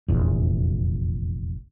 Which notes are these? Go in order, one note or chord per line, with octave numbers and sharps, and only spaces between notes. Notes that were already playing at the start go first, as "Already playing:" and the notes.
F1 A#1 E2